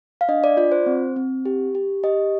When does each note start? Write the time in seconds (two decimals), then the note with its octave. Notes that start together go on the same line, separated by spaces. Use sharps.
0.21 F5
0.28 D4 D#5
0.44 D5
0.57 F4 D5
0.72 C5
0.86 C4
1.16 C4
1.46 G4
1.75 G4
2.04 G4 D#5